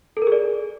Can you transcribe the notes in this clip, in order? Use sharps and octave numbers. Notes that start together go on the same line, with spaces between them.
A4
A#4
G#4
D5